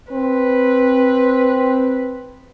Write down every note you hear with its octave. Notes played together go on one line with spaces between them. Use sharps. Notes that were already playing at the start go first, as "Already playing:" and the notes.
C4 B4